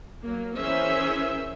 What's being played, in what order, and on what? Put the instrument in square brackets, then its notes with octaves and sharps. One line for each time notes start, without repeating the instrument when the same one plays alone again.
[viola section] F#3 A#3
E3 C#4 G#4 A#4 C5 E5